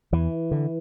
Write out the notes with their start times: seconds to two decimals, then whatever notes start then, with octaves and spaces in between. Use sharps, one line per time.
0.13 E2 E3
0.51 D3